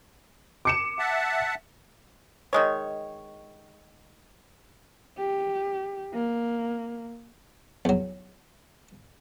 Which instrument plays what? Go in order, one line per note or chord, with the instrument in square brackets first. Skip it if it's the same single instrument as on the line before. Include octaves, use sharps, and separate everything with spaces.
[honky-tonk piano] D6 C#7 E7
[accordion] E5 F#5 A5
[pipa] D#3 G#3 C#5
[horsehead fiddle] G4
A#3
[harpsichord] E2 F#3